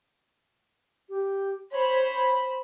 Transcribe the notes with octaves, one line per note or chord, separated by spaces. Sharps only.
G4
C5 C#5 B5